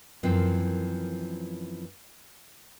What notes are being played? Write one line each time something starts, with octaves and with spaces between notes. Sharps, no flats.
F#2 E3 F3 A#3 C4